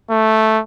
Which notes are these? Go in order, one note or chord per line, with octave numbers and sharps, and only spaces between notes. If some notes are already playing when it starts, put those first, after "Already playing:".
A3